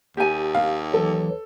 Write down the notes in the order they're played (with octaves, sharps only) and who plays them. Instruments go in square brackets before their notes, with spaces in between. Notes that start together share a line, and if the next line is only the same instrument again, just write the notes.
[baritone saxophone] D#2 [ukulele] G4 G#5
[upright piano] F5
[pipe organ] E3 F#3 [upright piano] A4